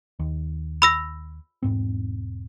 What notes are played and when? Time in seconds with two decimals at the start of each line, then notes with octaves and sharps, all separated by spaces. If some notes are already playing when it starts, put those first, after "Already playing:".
0.19 D#2
0.82 B5 E6 A#6
1.63 E1 G#2 C4